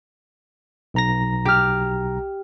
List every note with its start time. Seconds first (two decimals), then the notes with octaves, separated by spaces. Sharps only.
0.94 B1 A#5 A#6
1.45 G4 F6